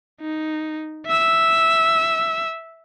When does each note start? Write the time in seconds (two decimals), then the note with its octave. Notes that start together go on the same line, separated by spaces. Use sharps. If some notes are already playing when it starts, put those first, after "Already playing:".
0.21 D#4
1.06 E5 E6